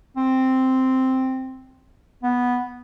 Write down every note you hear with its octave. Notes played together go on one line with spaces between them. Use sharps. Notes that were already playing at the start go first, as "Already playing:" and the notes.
C4
B3